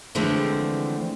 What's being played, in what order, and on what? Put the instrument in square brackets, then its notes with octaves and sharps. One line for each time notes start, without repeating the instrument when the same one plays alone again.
[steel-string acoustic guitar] D3 E3 F3 G#3 A3 C4